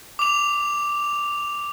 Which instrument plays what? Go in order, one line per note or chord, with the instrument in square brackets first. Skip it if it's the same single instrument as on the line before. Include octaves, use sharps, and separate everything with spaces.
[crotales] D6 F7